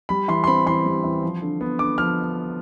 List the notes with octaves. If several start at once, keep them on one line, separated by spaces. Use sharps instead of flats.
G3 B5
E3 C6
C6
C4 B5
E3 C6
G3
E3
F3
D3
B3
D3 D6
F3 F6